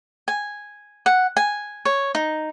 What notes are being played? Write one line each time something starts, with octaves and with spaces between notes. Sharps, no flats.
G#5
F#5
G#5
C#5
D#4